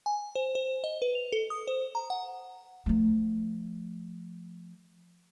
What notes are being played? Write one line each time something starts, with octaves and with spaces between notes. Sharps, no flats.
G#5
C5
C5
D#5
B4
F7
A4
D#6
C5
A#5
F#5
F3 A3